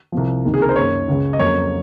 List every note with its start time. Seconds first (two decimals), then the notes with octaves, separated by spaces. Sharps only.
0.12 C2 C3 F3
0.45 C#2 C3 D#3 A#3
0.54 G#4
0.62 A#4
0.69 C5
0.76 F#2 D#3 A#3 C#5
1.08 C#2 C#3 G#3
1.33 D#5
1.39 F2 C#3 F#3 A#3 C#5